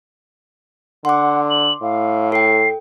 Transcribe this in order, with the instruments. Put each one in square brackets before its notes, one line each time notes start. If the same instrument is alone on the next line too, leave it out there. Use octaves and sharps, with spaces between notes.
[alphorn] D3 [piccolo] F#5 [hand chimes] C6 D6
[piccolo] F#7
[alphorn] A2 [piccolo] F5
[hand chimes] A4 G5 [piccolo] C7